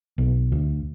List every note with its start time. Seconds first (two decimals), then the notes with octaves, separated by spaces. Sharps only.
0.18 B1
0.52 D2